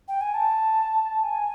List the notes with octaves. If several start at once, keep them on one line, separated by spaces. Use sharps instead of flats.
G5
G#5
A5
G#5